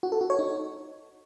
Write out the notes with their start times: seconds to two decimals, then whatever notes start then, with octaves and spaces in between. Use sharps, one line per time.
0.03 F#4
0.12 A4
0.21 F#4
0.30 C#5
0.39 D#4